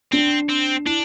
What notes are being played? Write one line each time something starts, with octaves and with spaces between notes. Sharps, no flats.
C4 D4
C4
D4 E4